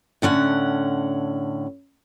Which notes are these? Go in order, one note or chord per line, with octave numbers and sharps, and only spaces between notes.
A2 D3 C#4 F#5